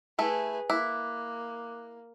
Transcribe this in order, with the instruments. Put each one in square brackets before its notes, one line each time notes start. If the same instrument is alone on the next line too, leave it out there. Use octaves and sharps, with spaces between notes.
[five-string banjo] A3 E4 [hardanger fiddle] G#4 B4
[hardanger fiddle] A#3 [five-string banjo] E4 [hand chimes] D6 F#6